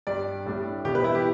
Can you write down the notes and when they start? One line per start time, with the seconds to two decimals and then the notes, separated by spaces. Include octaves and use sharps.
0.07 G2 G3 D4 D5
0.45 A2 G3 D4
0.85 E2 B2 G3 G4
0.95 B4
1.04 E4
1.15 G4